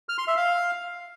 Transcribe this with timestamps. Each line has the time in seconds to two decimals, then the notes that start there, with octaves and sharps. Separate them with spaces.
0.09 F6
0.18 C6
0.28 E5
0.37 F5